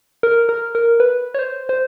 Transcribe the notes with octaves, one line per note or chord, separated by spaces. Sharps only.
A#4
A#4
A#4
B4
C#5
C5
C5